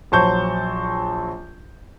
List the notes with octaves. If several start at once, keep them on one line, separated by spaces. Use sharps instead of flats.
A#1 F#3 C5 A5 C#6 G6